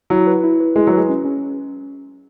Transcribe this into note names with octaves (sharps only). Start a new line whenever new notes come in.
F#3 E4
B4
E4
B4
G#3 E4
F#3
G#3 B4
C#4
C#4